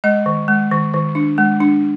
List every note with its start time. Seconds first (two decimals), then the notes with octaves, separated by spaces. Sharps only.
0.04 G#3 D#5
0.26 D#3
0.48 G#3
0.71 D#3
0.94 D#3
1.15 D4
1.38 G#3
1.61 D4